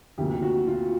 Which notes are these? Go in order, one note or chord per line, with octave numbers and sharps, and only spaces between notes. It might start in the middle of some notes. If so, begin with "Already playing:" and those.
D2 C3 F3 A#3 G4
F#4
F4